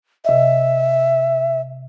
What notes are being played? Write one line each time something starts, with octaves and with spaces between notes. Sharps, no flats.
C3 D#5 E5